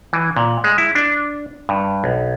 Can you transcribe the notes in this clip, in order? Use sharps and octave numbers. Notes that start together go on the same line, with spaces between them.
E3
A#2
G#3
E4
D4
G2
B1